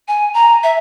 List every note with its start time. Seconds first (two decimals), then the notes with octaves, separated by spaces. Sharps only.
0.08 G#5
0.34 A#5
0.63 E5